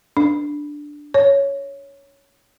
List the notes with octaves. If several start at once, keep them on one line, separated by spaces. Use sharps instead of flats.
D4
C#5